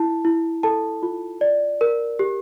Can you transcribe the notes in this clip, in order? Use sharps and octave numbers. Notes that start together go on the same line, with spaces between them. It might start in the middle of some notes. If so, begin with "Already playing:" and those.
Already playing: E4 A5
E4
A4 A5
F4
D5
A#4
G4